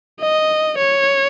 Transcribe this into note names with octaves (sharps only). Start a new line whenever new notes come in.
D#5
C#5